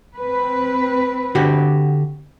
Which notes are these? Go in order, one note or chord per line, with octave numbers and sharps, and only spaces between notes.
C4 B4
D3 F#4 G4